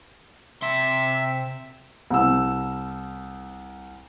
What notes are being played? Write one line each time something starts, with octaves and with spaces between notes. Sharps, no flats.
C3 E5 C6
C2 E6